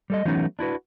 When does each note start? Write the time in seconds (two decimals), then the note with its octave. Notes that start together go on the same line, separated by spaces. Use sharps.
0.10 G3 A4 D#5
0.25 E3 F#3 A3 B3 C#4 D#4
0.59 D4 E4 F#4 B4